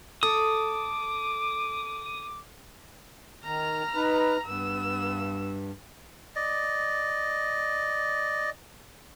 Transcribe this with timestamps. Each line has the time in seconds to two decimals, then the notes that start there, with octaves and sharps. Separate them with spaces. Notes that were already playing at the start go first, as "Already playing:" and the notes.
0.23 A4 D6 D#6
3.44 D#3 A#5 F6
3.95 D#4 B4
4.46 G2 B3 E6
6.36 D5 D#5